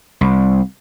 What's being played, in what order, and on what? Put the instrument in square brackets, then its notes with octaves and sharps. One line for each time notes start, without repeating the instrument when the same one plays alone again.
[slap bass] C2